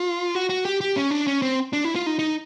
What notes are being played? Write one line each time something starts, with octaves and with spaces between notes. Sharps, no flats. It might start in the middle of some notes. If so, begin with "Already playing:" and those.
Already playing: F4
F#4
F#4
G4
G4
C#4
D4
C#4
C4
D4
E4
F4
D#4
D#4